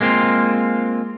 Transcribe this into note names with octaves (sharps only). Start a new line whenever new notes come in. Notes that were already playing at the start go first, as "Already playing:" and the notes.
G#3 A#3 C4 F4